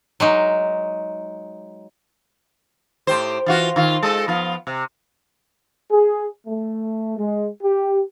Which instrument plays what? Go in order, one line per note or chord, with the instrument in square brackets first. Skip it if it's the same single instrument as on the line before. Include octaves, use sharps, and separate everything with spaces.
[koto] F#3 G#3 D#4
[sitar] A2 G4 C5
E3 F4 F#4
D#3 F4
G#3 A4 D#5
F3 B3 F4
C3
[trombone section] G#4
A3
G#3
G4